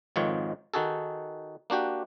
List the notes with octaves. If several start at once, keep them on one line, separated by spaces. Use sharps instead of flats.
G#1 F2 G#2 D#3 F4 C#5
D#3 D#4 F#4 G#4 A4
A#3 D4 F#4 G4